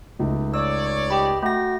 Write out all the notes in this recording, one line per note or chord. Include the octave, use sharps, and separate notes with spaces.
C#2 A3 D#4
C#5 D5 E6
G4 D#5 B5
A3 F#4 G5 A#6